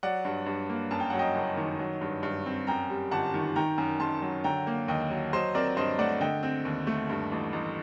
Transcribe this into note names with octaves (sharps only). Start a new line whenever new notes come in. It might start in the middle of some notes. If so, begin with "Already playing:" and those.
F#3 D5 F#5
G2
G2
A#3
F#2 A5
G5
F#3 F#5
D#5 G5
F#1
D#3
F#3
G2
G2
C4
F#2 G5 A#5
G3
G1 F#5 A5
D#3
D#3 G5 A#5
F#2
F#2 A5 C6
F#3
D3 G5 A#5
A#3
D#2 D#5 G5
F#3
F#3 C5 D#5
C4 A#4 D5
G2 C5 D#5
A3 D5 F#5
D3 D#5 G5
C4
D#2
A3
G2
A1
A1